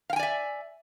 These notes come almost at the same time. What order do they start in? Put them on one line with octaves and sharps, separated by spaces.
F5 G5 G#5 D5 E5